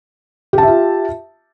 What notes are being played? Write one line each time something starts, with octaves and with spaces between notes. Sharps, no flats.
F4 G4 E5 A5